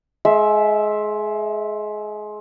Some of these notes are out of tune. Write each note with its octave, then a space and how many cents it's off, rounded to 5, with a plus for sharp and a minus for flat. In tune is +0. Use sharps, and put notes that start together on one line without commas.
G#3 +25 E5 +0